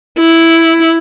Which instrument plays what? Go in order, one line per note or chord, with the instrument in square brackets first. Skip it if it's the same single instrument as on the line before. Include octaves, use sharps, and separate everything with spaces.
[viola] E4